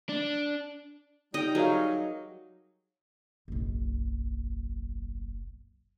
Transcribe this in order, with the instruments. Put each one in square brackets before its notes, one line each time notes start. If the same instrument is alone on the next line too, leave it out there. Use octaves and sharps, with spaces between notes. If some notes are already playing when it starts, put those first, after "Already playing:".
[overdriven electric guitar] D4
[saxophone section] G3 D#4 [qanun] D#5 G5
[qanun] F#3 [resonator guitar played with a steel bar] G#4 A#4 F5
[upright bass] F#1 B1